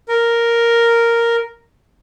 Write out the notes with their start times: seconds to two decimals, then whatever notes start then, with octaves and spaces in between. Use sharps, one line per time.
0.09 A#4